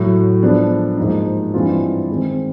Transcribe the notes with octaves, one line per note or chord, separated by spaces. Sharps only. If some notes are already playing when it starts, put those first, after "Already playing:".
Already playing: A2 F#3 A3
F3 G#3 B3 D4
G#2 F3 A#3 D#4
G2 E3 G#3 C4 F4
D#3 G#3 C4